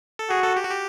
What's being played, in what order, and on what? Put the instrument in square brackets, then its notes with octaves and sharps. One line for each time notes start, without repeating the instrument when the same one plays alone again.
[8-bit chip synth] A4
[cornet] F#4 [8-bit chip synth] G#4
[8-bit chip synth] A4
G4
F#4
G4